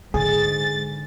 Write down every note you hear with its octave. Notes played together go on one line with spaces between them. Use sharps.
G#2 D3 G#4 A6